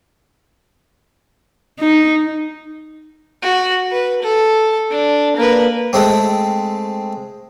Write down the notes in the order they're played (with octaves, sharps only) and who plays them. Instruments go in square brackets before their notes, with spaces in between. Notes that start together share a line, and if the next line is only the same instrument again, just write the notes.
[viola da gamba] D#4
[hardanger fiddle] F#4
B4
A4
D4
A#3 B4
[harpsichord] G#3 A3 C4